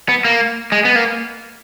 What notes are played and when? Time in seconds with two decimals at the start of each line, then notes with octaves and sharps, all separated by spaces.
0.09 B3
0.25 A#3
0.72 G#3
0.85 B3
0.95 A#3